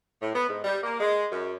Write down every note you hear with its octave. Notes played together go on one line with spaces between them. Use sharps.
A2
B3
G#2
G3
A#3
G#3
F#2